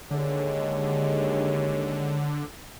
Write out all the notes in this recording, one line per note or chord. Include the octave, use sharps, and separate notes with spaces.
D#2 D3 G#3 C#5